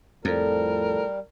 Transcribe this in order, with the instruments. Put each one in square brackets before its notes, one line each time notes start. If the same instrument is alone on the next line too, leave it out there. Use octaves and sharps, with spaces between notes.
[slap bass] F2 [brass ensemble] A2 F3 A4 [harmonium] G3 [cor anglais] A#4